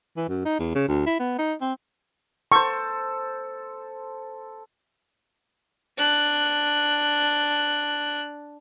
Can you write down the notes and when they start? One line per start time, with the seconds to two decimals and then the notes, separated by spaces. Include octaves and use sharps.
0.17 E3
0.29 F#2
0.45 D#4
0.59 E2
0.75 C#3
0.88 D2
1.06 E4
1.20 B3
1.39 D#4
1.61 C4
2.52 A4 C5 C#6
5.97 D4 F#6